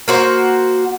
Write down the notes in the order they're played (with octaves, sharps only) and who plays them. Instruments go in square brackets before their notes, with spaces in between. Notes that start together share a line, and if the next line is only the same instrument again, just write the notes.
[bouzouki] A#3 F#4 C5